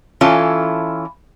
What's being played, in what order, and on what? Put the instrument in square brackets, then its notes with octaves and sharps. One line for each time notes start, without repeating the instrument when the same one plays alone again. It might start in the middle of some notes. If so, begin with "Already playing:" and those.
[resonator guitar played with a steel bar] E3 C#4 E4 F4 A4